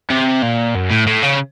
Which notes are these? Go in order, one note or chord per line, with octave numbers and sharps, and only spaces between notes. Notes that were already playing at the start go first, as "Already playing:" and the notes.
C3
A#2
F#2
A2
A2
C#3